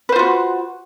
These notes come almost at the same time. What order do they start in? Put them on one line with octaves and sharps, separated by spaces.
B4 C5 F4 F#4